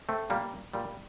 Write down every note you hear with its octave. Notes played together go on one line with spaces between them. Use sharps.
A3 C4
A#2 G3 A#3
A#2 G3